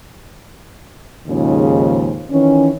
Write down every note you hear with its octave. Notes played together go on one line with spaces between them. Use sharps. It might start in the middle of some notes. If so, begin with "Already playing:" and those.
D#2 G#2 C#3 F3
D#3 E3 C#4